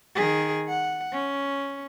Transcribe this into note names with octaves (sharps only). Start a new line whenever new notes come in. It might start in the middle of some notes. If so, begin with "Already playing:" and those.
D#3 G#4
F#5
C#4